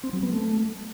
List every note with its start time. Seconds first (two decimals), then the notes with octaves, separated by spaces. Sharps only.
0.03 C4
0.13 F#3
0.23 B3
0.33 A3